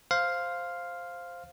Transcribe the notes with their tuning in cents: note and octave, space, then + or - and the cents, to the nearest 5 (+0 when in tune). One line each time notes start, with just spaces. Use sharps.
C5 +0 F5 +0